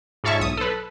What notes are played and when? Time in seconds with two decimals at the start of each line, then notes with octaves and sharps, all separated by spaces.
0.24 G#2 F4 C#5 E5 A5 C#6
0.40 B1 D#6
0.57 A4 B4